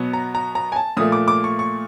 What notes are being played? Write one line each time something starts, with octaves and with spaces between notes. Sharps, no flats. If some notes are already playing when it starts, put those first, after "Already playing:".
Already playing: B2 F#3 B3
A#5
A#5
A#5
G#5
A5
A#2 F3 A3 D#6
D6
D6
C#6
C#6